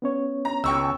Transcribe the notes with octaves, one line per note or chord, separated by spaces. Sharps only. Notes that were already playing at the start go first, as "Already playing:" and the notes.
B3 C#4 C#5
A#5
C#2 G5 C#6 E6